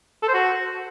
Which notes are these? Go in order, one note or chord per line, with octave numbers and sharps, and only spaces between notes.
A4
C5
F#4